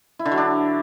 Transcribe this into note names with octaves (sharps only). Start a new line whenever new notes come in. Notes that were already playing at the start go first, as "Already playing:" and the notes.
E4
D3
F#3
D4